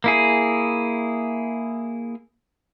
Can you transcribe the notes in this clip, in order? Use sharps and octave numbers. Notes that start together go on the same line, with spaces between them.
A#3 E4 G#4